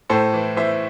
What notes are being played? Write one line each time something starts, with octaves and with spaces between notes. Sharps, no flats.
A2 A4 C5
E3
E3 C5 E5